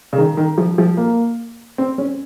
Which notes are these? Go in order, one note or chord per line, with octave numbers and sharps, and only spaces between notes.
C#3
D#3
D#3
F3
F3
A#3
C4
C#4